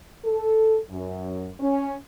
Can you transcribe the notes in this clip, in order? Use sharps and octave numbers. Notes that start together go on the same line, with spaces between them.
A4
F#2
C#4